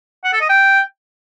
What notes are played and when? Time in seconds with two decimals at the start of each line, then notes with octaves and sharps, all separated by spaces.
0.24 F#5
0.32 A4
0.41 D#5
0.49 G5